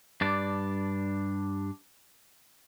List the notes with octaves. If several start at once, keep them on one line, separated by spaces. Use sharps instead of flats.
G2 D4 D5